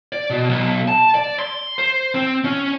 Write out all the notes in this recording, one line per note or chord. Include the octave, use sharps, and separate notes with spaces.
D5
B2
B1
A5
D5
C6
C5
C4
C#4